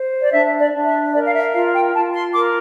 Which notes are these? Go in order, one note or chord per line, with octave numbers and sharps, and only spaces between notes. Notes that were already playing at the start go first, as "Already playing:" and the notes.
Already playing: C5
D5
D4 E5
D5
D4
E5
A#4 D5
F5
E5
F4 F5
G5
F4 A5
C6
A#4 D6